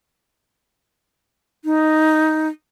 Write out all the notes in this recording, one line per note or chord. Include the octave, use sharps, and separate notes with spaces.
D#4